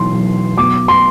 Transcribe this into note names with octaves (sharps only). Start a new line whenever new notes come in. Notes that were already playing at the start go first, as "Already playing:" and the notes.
Already playing: B1 E3 C6
B1
B2 D6
C6